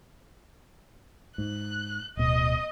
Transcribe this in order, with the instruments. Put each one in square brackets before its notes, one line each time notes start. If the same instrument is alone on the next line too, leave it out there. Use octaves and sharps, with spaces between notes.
[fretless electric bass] G#2 [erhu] F#6
[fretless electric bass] D1 B2 [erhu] D#5